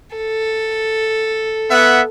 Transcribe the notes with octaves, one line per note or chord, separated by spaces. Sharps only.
A4
B3 E5 F#5